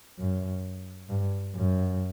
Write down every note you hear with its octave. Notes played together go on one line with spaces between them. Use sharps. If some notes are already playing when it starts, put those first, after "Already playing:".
F#2
G2
F#2